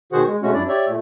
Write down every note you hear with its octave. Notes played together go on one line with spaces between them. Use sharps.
B2 D#3 F#4 G#4 C5 F#5
G#3
B2 G#3 A3 C#4 F#4
F#2 D4 E4 D5
G4 C#5 D5 E5
A#2 A3